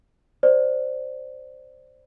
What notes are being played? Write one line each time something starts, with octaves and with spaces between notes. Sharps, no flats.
C5 D5